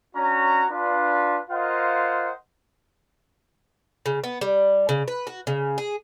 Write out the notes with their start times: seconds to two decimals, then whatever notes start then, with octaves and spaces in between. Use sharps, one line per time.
0.16 C#4 D4 F#4 C#5 A#5
0.71 D4 F4 B4
1.50 F4 A#4 C5 D#5 F5 F#5
4.06 C#3
4.24 B3
4.41 G3
4.89 C#3
5.08 B4
5.27 F#4
5.47 C#3
5.78 G#4